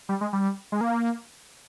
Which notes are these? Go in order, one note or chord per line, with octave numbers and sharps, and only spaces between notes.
G3
G#3
G3
G#3
A#3